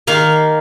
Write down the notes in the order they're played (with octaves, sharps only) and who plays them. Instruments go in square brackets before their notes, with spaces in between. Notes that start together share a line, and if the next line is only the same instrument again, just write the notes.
[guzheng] D#3 A#3 F5